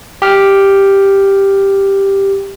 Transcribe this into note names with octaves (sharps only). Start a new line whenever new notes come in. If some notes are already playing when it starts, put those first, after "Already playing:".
G4 F6